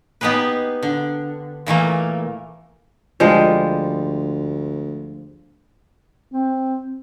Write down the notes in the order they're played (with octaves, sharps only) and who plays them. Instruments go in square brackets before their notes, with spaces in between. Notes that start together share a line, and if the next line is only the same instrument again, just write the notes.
[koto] B3 D#4 G4 G#4 B4
D3
A#2 E3 A3 A#3
[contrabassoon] D2 [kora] F3 G3 G#3
[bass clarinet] C4